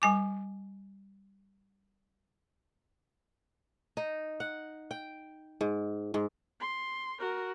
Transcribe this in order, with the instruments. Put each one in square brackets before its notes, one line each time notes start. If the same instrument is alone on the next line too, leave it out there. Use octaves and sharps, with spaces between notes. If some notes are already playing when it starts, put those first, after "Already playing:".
[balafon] G3 G#5 D6
[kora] D#4
F#5
G5
G#2
G#2
[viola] C6
F#4 A#4